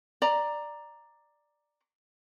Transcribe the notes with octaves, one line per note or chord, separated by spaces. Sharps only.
D5 A#5